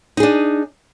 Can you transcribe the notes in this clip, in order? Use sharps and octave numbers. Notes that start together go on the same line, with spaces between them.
D4 D#4 G#4